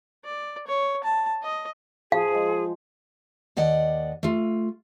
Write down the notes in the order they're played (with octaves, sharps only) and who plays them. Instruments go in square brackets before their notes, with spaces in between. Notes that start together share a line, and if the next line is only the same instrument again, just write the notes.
[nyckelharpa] D5
C#5
A5
D#5
[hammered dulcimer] F3 [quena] G#4 [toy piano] F5
[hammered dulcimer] G#3 C5
[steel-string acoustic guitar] D#2 D5 D#5 F#5
A3 F4